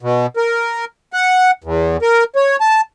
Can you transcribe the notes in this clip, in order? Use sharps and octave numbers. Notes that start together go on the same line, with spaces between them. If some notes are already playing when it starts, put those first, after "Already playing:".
B2
A#4
F#5
E2
A#4
C#5
A5